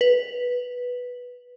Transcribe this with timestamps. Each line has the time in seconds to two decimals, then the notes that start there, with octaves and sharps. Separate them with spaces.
0.01 B4